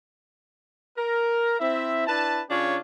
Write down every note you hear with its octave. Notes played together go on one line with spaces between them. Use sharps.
A#4
C4 E4 E5
D4 E4 B4 A5
C#3 C#4 D4 F4 G4 C#5